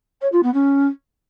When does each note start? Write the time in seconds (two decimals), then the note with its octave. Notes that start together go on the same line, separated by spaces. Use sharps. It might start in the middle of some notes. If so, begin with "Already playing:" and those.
0.21 C#5
0.32 F4
0.42 B3
0.53 C#4